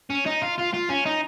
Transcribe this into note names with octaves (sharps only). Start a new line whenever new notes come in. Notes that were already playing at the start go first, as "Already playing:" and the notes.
C#4
D#4
F4
F4
F4
C#4
D#4